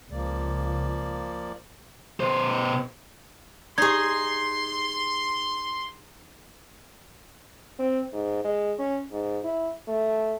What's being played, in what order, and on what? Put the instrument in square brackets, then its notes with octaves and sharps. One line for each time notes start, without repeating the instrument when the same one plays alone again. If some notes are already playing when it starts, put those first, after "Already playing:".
[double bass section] C#2 [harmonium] F3 A#3 D5
[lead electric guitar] B2 C5
[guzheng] D#4 G#4 [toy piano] G4 D5 [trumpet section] C6 [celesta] G#6
[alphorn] C4
G#2
G#3
C#4
G#2
E4
A3